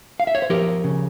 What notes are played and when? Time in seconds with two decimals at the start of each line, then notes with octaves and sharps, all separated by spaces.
0.20 F5
0.27 E5
0.35 C#5
0.42 C5
0.50 F3 G4 A#4
0.84 C#3